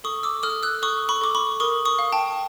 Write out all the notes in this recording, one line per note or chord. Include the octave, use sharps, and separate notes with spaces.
A4 C#6 D#6
D6 E6
A4 D#6 F6
E6 F#6
A4 C#6 D#6
B5 C#6
A4 D6
B5 C#6
A#4 C#6 D#6
C#6 D#6
F5
G5 A5